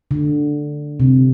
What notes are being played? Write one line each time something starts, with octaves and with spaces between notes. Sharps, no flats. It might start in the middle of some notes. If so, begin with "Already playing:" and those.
D3
C3